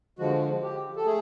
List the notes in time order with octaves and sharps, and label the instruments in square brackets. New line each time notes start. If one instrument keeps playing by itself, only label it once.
[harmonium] D3 F3 G#3 F#4
G4
A4
A3 G#4